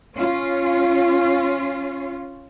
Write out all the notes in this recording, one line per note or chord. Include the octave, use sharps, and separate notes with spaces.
C#4 F4